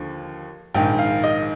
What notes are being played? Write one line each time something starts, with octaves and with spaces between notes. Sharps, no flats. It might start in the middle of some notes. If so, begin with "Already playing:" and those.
Already playing: D#2 D3 F3
A#1 G#2 D#3 G5
F5
D#5